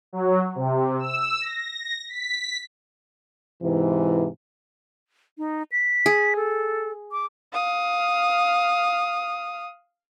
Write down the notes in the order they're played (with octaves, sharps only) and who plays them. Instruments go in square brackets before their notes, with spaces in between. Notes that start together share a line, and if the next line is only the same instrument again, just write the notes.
[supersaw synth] F#3
C3
E6
A#6
B6
[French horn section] G#2 C3 E3
[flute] D#4
B6
[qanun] G#4
[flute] A4
D6
[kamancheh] F5 D#6